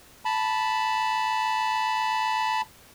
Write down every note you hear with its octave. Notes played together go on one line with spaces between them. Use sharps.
A5 B5